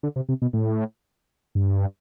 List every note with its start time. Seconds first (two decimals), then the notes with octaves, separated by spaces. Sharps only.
0.03 D3
0.16 C3
0.29 C3
0.42 B2
0.53 A2
1.55 G2